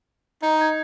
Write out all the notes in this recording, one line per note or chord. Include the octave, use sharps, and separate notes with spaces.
D#4 D#5
G#6